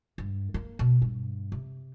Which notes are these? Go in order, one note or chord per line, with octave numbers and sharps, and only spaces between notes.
G2
A#3
B2
G2
C3